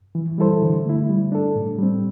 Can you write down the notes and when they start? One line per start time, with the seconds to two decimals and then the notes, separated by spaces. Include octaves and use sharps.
0.15 E3
0.38 G3 E4 A4 C5
0.62 D3
0.85 A3 E4
1.09 G3
1.32 D4 A4
1.56 A2
1.79 G3 C4